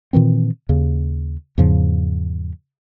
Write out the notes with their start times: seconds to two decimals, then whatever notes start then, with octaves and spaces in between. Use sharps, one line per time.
0.13 A#2 D#3 E3 C4
0.69 D#2 C#3
1.58 E2 G#2 C#3 F3